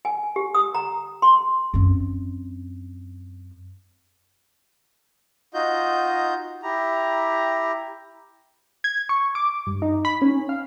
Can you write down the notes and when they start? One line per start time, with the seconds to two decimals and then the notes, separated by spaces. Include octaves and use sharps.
0.05 G#5
0.36 G4
0.55 D#6
0.75 A#5
1.22 C6
1.74 F#2 C4
5.54 D#4 F4 F#4 D#5 G6
6.63 E4 G4 A#5
8.84 G#6
9.09 C#6
9.35 D6
9.67 G2
9.82 D#4
10.05 B5
10.22 C#4
10.49 F5